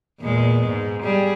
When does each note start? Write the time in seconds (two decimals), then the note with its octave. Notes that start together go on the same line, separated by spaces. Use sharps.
0.21 E2 A#2 G#3
0.67 G#2
1.02 G3 G#4